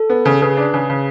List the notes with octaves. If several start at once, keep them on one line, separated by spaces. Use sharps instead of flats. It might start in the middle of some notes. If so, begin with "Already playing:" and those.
Already playing: A4
B3
C#3
C#3 G#4 B4
D4
C#3
C#3